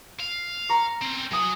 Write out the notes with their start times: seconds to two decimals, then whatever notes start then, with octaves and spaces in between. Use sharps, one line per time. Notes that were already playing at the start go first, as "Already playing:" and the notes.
0.20 F5
0.69 A#5 C#6
1.01 C4 C#4
1.31 F#3 F#5 G#5 D#6